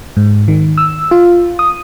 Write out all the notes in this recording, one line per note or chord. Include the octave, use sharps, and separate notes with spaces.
G#2
D#3
E6
F4
D#6